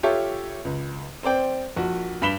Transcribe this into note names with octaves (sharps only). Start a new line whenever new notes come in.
F4 G4 A4 C#5 E5
C#2
C4 C5 D5 G5
A#1 F#4
G2 B5 B6 E7 G7